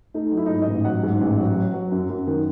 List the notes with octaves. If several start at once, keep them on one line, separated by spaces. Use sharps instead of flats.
A3 D#4
F#3
E4
D#4
G#2 E4
D#5
A1
F#3 F#5
G#2
A1
F#3
F#3
F#3
F#2
F#2
D#3